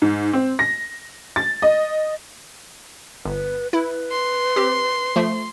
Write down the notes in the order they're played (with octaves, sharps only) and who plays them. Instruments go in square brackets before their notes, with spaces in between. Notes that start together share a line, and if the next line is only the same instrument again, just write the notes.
[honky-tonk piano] G#2
C4
A#6
A6
D#5
[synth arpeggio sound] G1 [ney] B4
[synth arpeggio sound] E4 [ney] B4
[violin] C6
[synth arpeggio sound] C4 G4
F3 A3